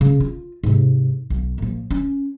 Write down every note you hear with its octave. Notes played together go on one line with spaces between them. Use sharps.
C#3
F4
G#2 C3
B1
A#2 F3
C#4